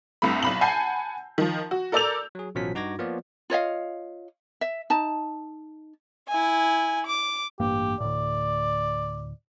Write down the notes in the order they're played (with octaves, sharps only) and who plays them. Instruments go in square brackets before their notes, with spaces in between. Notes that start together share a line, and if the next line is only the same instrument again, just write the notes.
[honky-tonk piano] C2 G2 C3 A3 B5
B1 B5 F#7
F#5 G#5 A5 B5 G6 C7
D#3 F3
F#4
A4 A#4 D5 E6 G6 F7
[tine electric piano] F#3 G#4
A1 B2 F3 F#3 C#4 B6
G2 D#4 F#4 D6 G#6 A#6
F3 A#3 B3 F4 C#5 D5
[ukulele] F4 C#5 D#5 F5
E5
D#4 A5
[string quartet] E4 G#5
D6
[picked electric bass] A1 G2 A#3 [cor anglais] G4
[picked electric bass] D2 A2 [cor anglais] D5